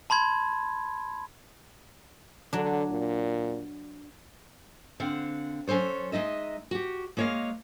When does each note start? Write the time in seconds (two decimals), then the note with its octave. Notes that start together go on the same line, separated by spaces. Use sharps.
0.10 A5 B5 C6 G#6
2.53 D3 F#3 D4
2.90 A#2
5.00 D3 C4 F5 F#5
5.67 F#3 C#4 A4 C5 C#5
6.12 G#3 D#4 D#5 E5
6.71 F#4 G4
7.17 G#3 A#3 C#5 D#5 F5